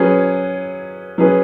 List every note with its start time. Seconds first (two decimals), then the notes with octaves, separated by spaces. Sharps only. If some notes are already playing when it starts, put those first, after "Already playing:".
Already playing: F#3 C#4 G#4 B4
1.18 F#3 C#4 G#4 B4